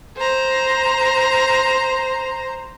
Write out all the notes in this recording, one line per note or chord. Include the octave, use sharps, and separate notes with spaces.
C5 A#5